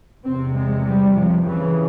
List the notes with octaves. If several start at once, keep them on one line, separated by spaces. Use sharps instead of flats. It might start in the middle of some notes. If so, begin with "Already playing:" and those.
E2 C3 C4
G#3
G3
F3
F2 C#3 E3